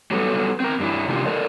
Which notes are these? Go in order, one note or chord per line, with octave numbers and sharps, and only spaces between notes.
F#3 G3 B3 A4
C4 A#4
G2 D4 E4
C3 G#3 A#3 D4 F4 G4
A4 A#4 D5